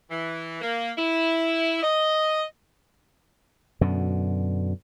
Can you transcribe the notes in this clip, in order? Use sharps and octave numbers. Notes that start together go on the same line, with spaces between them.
E3
A#3
E4
D#5
F#2 B2 D3